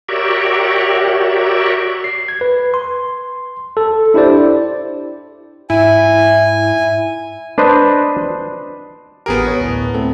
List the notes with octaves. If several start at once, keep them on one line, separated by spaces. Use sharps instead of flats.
F#4 G4 A#4 C#5 D5 E5
C7
G#6
B4
C6
A4
D4 E4 G4 C5 D5
G#2 E4 E5 G#5
D4 B4 C5 D#5
A1 B3 G4 G#4 A#4
B4 C#5
D2 A2
A3 C4 A4